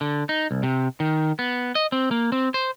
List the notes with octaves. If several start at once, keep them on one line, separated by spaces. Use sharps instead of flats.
D3
D#4
C2
C3
D#3
B3
D#5
C4
A#3
C4
C5